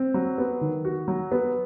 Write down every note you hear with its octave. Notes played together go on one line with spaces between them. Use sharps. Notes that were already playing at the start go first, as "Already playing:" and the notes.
Already playing: C4
F#3
B3
D#3
F#4
F#3
B3